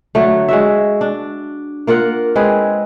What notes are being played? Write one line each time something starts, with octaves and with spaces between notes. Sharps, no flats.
D3 F#3 A3
G#3 F#4 E5
D4
A#3 F4 A#4 F#5
G#3 C4 G#4 B4